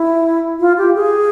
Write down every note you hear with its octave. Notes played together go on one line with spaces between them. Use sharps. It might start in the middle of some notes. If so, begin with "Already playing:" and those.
Already playing: E4
F4
G4
G#4